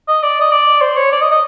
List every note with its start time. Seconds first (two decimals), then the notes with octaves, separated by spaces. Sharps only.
0.08 D#5
0.23 D5
0.41 D#5
0.52 D5
0.81 C5
0.97 C#5
1.12 D5
1.21 D#5
1.31 D#5